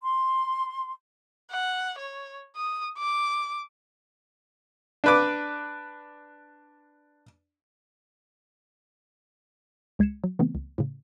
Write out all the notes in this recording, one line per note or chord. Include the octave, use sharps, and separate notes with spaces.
C6
F#5
C#5
D#6
D6
D4 B4 D6
C#2 G#3 G#6 C7 C#7 E7
F#3
C#3 E3 A3 B3 C4
C#2
A2 C#3